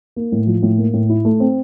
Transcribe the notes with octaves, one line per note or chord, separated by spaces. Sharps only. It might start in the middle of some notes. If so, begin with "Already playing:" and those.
A#3
A2
F3
A2
A#3
A2
E4
A3
C4